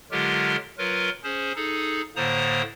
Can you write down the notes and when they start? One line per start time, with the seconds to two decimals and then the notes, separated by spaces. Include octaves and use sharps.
0.11 D3 F#3 G#3 F4 G4 A#4
0.78 F#3 F4 A#4 B4
1.24 C#4 G#4 C5
1.56 D#4 G#4 A4
2.16 A2 D3 A#3 C5 A#5 D#6